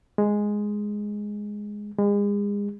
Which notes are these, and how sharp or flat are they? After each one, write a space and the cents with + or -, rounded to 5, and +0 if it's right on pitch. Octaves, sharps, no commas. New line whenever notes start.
G#3 +0
G#3 -35